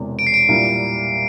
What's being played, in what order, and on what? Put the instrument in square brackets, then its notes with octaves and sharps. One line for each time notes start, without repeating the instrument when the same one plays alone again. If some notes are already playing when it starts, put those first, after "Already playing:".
Already playing: [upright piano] E1 E2 C3
[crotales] D7
C7
D7
[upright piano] A#2 G3 A#3 E4